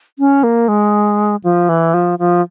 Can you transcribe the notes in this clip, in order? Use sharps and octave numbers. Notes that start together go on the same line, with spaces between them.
C#4
A#3
G#3
F3
E3
F3
F3